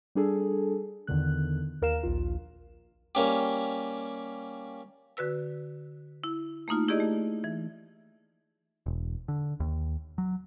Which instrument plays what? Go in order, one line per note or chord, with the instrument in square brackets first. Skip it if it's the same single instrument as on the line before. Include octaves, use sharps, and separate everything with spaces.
[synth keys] G3 D4 G#4 A4
E2 D3 D#3 F#6
D#2 A#4 F5 E7
A#1 D#2 F4
[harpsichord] G3 A#3 C#4 G4
[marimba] D3 F#4 B4 E6
E4
A3 A#3 D#4 F4
E4 G4 G#4 D5 D#5
A3
E3
[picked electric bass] E1
D3
D#2
F#3